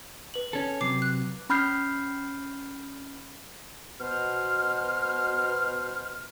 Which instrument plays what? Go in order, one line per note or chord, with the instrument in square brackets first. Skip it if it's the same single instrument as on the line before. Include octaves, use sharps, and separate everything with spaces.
[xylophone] B4 F#7
[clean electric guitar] C#4 A4
[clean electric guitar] C3 F#3 [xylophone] D6 C7
[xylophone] F#6
[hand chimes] C#4 B5 F6 G6 C7
[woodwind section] B2 C5 F6